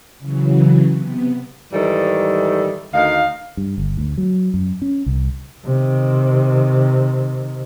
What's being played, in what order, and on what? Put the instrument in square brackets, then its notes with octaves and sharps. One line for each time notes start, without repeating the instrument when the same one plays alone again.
[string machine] C#3 E3 F#3
C3 B3
[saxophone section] G#2 D#3 E3 G3 A4
D2 D#3 D#4 F5
[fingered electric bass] G2
G1
D2
F#3
F#2
C#4
C2
[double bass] C3 D#3